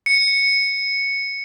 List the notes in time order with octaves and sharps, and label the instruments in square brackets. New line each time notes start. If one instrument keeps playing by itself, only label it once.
[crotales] C#7